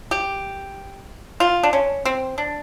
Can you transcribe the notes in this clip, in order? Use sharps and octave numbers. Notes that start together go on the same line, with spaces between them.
G4
F4
D4
C#4
C4
D4